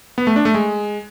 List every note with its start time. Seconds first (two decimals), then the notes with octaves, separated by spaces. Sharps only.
0.18 B3
0.27 A3
0.36 D4
0.45 A3
0.54 G#3